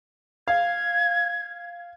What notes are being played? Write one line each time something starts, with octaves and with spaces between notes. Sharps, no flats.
F5 G#6